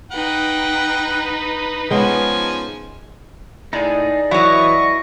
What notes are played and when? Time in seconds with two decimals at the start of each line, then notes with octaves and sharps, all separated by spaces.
0.12 D#4 B4 F#5 G5
1.91 F3 G#3 B3 C#4 G#5
3.73 A2 D#4 G#4 D5
4.31 E3 F#3 E4 D#5 C#6